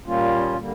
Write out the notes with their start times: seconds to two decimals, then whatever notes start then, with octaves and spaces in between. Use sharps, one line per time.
0.06 A#2 G3 A#3 C#4 F4
0.58 D3 G3 A#3